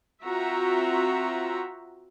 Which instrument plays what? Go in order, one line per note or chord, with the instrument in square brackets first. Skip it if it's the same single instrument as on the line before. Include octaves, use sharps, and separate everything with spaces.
[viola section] C4 F4 F#4 E5 A#5